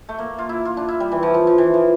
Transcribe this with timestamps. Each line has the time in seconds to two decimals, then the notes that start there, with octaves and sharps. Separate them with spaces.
0.09 A3
0.19 A#3
0.38 F4
0.49 E4
0.65 F4
0.77 D4
0.88 E4
1.00 G3
1.12 E3
1.23 F3
1.34 F3
1.47 F3
1.58 E3
1.74 F3